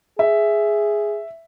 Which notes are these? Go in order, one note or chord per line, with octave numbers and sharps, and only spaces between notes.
G#4 E5